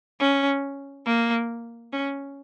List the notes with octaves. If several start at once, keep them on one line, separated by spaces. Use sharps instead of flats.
C#4
A#3
C#4